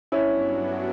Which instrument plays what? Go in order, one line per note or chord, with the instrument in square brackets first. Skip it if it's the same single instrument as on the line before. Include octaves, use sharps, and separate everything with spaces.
[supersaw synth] G2 F#3 B3 D4 F#4 [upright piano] C#4 E4